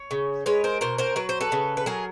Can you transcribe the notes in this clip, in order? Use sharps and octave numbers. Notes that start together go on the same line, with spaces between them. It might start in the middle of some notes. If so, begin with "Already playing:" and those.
Already playing: C#5
C#3
G#3 B4 C#5
A#4 C5
B2 A#4 C5
A#4 C5
F#3 B4
C5
A4 B4
C#3
B4
F#3 G#4 A#4